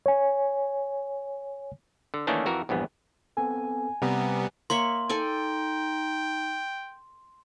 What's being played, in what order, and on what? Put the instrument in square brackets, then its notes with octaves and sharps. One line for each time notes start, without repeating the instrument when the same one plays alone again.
[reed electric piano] C#5 G#5
[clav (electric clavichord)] D3
D#3 E3 A3 A#3 C#4 D4
F2 E3 F#4 A#4
A#1 E2 G2 B3
[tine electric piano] B3 C4 A4 [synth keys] G#5
[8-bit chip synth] C3 G3 B3 [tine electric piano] F#5 A#5
[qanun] A#3 C#5 E5 [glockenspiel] C6
[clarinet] D#4 [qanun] A4 D5 G#5 [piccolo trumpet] G5